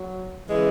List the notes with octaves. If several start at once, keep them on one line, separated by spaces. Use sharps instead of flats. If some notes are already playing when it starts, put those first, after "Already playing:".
Already playing: F#3
C#3 E3 G#3